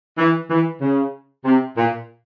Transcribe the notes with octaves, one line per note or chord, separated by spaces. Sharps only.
E3
E3
C#3
C3
A#2